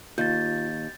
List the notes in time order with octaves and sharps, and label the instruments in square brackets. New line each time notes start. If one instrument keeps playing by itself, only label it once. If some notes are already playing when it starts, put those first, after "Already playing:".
[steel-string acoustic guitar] D#2 [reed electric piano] F4 [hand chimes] G6 A6